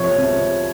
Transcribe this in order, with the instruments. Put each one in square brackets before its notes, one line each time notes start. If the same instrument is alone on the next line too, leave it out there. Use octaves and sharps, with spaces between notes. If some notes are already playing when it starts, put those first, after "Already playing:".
Already playing: [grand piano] C2 F3 [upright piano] C#5
[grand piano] C3